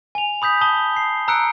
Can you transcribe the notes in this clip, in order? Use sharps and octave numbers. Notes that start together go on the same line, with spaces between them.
G#5 F7
B5 D#6 G6 B6
A5 D#6 G7
C7
A#5 E6 F#6 C#7 D7